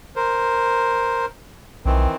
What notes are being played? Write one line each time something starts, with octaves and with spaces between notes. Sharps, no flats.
A#4 C5
B1 D#3 E3 C4